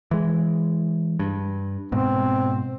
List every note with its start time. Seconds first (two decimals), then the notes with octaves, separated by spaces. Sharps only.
0.11 E3 G#3
1.19 G2
1.92 G#2 B2 C4